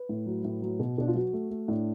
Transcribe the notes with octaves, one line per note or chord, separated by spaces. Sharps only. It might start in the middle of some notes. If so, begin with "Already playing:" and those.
Already playing: B4
A2
F#3
A2
F#3
B2
B2 D4
F4
F#3 F#4
A3
A3
A2 D4